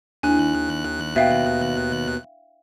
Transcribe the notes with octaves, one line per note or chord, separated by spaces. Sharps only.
D#2 D4 E4 G#5 F#6
B2 E5 F5 G5